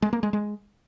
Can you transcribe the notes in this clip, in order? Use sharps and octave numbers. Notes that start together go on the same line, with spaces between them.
G#3
A#3
G#3
G#3